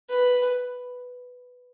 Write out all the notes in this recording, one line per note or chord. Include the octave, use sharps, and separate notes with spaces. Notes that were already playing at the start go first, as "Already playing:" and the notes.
B4